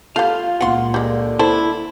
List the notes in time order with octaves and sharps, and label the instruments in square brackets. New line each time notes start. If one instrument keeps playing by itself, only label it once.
[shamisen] G3 A3 [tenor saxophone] F4 [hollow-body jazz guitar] F5
[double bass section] C#2 A#2 A#3 [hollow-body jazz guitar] F#5 C6
[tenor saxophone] D3 [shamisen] G3 G#3
[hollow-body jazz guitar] E4 [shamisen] A4 C5